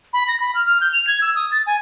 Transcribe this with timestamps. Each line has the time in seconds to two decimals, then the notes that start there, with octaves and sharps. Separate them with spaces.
0.13 B5
0.28 A#6
0.40 B5
0.55 F6
0.66 F6
0.81 G6
0.93 F7
1.07 G#6
1.22 E6
1.36 D#6
1.52 A6
1.67 G#5